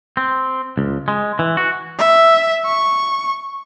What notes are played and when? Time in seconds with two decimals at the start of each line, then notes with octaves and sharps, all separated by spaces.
0.17 C4
0.78 C#2
1.08 G#3
1.39 E3
1.57 F#4
1.99 E5
2.66 C#6